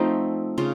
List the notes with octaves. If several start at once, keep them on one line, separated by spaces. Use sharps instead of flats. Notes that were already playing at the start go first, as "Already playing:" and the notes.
Already playing: F3 A3 C4 D#4
C#3 F4